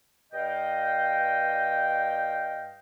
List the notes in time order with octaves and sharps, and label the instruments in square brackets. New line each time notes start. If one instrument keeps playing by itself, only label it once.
[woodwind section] G2 D#5 F5 G5